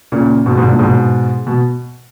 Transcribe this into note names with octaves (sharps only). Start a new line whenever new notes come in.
A#2 C#3
G#2 B2
G#2 B2
G2 A#2
G#2 B2
B2